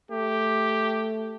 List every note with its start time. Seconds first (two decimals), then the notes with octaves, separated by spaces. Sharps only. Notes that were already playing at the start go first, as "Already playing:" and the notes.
0.11 A3 G4